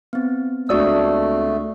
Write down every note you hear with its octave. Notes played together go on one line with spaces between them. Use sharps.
B3 C4
C#2 A3 D4 F#4 D5 D#6 E6